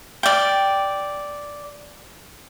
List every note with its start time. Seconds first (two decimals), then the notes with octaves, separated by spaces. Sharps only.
0.23 D5 G5